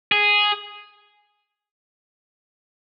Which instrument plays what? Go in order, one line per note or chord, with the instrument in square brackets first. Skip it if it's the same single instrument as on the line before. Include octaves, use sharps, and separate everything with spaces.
[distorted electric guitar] G#4